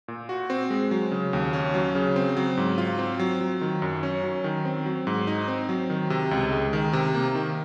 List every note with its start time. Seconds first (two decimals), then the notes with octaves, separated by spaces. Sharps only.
0.08 A#2
0.29 F#4
0.50 C4
0.70 G#3
0.91 F#3
1.11 C#3
1.33 D#2
1.53 C#4
1.74 F#3
1.95 C#3
2.16 C4
2.37 F#3
2.57 G#2
2.78 F4
2.99 C4
3.19 F#3
3.41 F#3
3.61 D#3
3.82 F#2
4.03 C#4
4.24 F#3
4.44 D#3
4.65 C4
4.86 F#3
5.07 G#2
5.27 D#4
5.48 C4
5.69 F#3
5.90 D#3
6.10 C3
6.31 C#2
6.52 G#3
6.73 D#3
6.93 C3
7.15 A#3
7.35 D#3